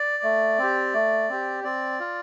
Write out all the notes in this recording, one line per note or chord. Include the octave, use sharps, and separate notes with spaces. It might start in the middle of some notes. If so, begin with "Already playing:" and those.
Already playing: D5
A3
C4 G4
A3
C4 G4
C4 D5
F4